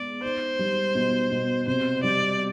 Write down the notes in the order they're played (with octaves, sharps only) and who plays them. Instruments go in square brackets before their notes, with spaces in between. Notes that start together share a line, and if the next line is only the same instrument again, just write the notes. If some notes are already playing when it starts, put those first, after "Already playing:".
Already playing: [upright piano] G#3 B3 [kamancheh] D5
[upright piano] D#4 [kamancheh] C5
[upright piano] G3
B2
B2
[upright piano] C3 [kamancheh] C5
[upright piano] G3 [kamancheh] D5